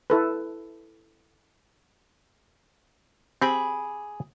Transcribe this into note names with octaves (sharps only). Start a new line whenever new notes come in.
E4 A4 B4
C4 G4 G#4 G5 B5 D6